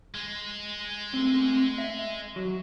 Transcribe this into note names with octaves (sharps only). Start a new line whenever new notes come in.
G#3
A3 C4
E5
F#3